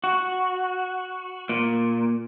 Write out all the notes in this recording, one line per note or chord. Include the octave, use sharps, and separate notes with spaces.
F#4
A#2